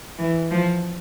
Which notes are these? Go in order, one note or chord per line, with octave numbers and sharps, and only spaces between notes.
E3
F3